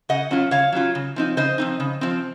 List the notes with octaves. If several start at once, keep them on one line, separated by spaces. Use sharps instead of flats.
C#3 D#5 F#5
F#3 C#4 F4
C#3 C#5 F5
F#3 C#4 F4
C#3
F3 C4 D#4
C#3 C5 D#5
F3 C4 D#4
C#3
F3 C4